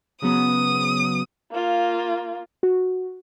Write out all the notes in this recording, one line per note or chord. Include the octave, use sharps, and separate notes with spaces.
C#3 F#3 B3 D#6
A#3 F4
F#4